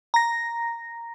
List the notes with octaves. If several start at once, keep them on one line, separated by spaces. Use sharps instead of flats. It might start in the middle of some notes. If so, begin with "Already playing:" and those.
A#5 A#6